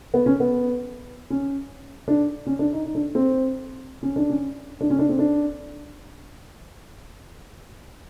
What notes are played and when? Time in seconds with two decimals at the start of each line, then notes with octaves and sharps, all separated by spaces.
0.14 B3
0.26 C#4
0.40 B3
1.30 C#4
2.08 D4
2.46 C#4
2.59 D4
2.73 D#4
2.85 D#4
2.95 D4
3.15 C4
4.03 C#4
4.16 D4
4.30 C#4
4.81 D4
4.90 C#4
4.99 D4
5.09 C4
5.19 D4